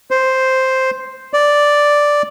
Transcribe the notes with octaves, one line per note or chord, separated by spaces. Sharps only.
C5
D5